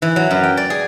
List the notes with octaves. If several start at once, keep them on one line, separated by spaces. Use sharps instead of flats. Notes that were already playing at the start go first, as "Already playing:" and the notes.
E3
F#3
F#2
G5
D5
G#4